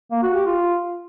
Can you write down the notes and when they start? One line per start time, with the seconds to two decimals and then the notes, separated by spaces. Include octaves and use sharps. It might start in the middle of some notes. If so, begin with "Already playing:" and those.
0.11 A#3
0.23 F#4
0.34 G4
0.46 F4